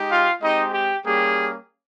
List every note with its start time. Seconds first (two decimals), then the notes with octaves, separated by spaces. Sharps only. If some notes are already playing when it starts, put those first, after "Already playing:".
Already playing: G#3 D#4 G4
0.09 F4 F5
0.42 G#3 C4 D#4 G4 D#5
0.74 G4
1.05 G3 A#3 C#4 G4 G#4